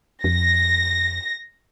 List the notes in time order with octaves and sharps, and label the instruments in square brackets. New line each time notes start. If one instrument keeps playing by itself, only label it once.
[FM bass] F2 [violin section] A#6